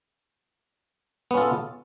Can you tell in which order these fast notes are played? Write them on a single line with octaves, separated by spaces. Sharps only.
B3 C#4 F4 A4